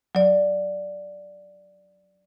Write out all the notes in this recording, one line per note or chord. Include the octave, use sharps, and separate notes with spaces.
F#3 D5